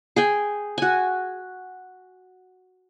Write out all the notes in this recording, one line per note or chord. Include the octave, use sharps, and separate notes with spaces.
G#4 G5 G#5
F#4 G#5